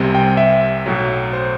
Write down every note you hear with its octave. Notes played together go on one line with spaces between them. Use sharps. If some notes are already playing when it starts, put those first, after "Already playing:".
Already playing: C2 C3 G3 C4
G5
E5
B1 A2 F#3
C5